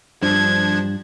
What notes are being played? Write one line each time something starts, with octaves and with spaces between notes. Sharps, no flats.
G2 F3 D4 G#6